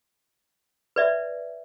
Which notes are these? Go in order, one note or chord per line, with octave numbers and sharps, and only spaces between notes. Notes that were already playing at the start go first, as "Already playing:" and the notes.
B4 D5 E5